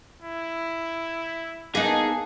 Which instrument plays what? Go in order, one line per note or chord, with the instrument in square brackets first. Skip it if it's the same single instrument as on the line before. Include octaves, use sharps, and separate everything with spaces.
[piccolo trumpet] E4
[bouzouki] A#3 A5 [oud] B3 D#4 [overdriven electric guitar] G#4 [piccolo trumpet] F#5